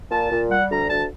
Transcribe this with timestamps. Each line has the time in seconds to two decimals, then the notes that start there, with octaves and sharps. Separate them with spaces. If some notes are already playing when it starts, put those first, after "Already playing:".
0.11 A#2 A5
0.31 A#2
0.50 G3 F#5
0.71 D2 A#5
0.89 D2 A5